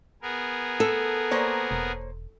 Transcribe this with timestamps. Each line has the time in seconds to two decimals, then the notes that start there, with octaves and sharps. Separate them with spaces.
0.22 B3 G#4 A#4
0.80 A4
1.31 A#3 C5 C#5
1.71 E1